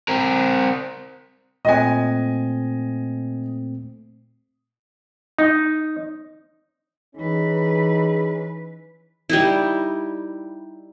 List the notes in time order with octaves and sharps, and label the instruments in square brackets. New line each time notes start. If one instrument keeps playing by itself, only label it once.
[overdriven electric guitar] C4 A#4
[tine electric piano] A#2 A3 C4 [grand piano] D#5 G#5
[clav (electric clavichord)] D#4
[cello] E3 B4 [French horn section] C#4 D#4 G#4
[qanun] G3 D#4 E4